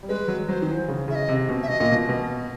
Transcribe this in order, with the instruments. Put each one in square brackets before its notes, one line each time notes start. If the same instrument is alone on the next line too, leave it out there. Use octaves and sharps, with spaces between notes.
[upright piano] G3
[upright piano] G#3 [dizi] B4
[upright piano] F#3
[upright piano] F#3 [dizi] C5
[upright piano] D#3
E3
C#3
[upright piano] C#3 [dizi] E5
[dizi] D#5
[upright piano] C3
B2
[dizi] E5
[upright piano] B2 [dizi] D#5
[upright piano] A#2
B2
B2